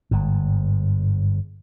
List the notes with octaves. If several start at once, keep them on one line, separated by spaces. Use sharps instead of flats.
G1 G#2